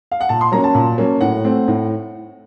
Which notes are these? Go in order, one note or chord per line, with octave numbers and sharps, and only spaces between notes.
F5
F#5
A#2 A5
C6
F#3 A#3 C#4 A#5
A5
A#2
F#3 A#3 C#4
A2 F#5
A3 C4
A2